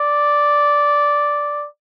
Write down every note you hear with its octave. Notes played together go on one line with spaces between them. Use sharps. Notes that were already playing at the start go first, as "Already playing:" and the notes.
Already playing: D5